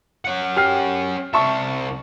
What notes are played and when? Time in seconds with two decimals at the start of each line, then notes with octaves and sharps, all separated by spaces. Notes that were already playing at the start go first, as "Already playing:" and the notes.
0.25 C#4 F#5
0.57 G4 F6 C7
1.34 C2 E5 A5 C#6